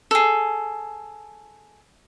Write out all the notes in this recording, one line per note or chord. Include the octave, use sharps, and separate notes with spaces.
G#4 A4